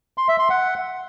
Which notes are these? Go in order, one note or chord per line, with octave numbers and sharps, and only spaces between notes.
C6
E5
C6
F#5